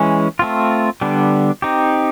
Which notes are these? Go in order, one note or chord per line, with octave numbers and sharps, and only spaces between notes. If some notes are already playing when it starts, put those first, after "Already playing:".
Already playing: E3 G#3 C#4
A3 C4 F4
D3 G3 B3 D4
C4 D#4 G4